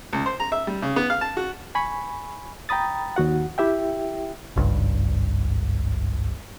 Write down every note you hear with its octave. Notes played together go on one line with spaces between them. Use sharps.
C#2
C5
A#5
E5
G3
C#3
B3
F5
A5
F#4
G#5 B5 C#6
G5 A#5 B5 D#6 A6
D#2 F#4 F#5
E4 G4 E5 G5
G#1 C#2 G2